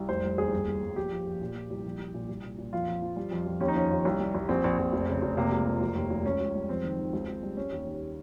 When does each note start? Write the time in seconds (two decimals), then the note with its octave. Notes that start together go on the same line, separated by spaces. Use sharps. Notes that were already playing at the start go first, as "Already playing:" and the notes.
Already playing: C2
0.09 F1 C5
0.23 G3
0.38 D#2 G#4
0.52 G1
0.67 G1
0.82 G1
0.96 A#1 G4
1.12 F3
1.26 A#1
1.41 A#2
1.55 F3
1.70 C2
1.84 A#1
1.99 G3
2.14 A#2
2.29 C2
2.43 A#2
2.58 A#2
2.73 F2 F4
2.88 F2
3.02 F3
3.16 G3
3.32 F2
3.46 F2
3.61 D#2 C#4
3.68 D#4
3.75 F3 C#4
3.91 D#2
4.05 C2
4.20 G3
4.35 C2
4.49 A#1 C4
4.64 A#1
4.78 A#1
4.93 F1
5.08 C#3
5.22 F1
5.37 C3 A#3
5.52 C#2
5.66 F3
5.81 F1
5.95 D#2
6.10 F1
6.25 C#2 C#4
6.40 C#2
6.55 G3
6.69 F2 C4
6.84 D#3
6.98 D#3
7.13 C#2
7.28 C#2
7.43 G3
7.57 G3 C#4
7.72 D#2
7.87 D#3